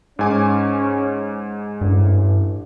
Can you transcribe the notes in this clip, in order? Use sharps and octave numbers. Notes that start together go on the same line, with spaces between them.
G#2 C#4 G#5 D6
A1 G2